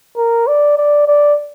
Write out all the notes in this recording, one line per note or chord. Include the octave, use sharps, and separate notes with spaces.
A#4
D5
D5
D5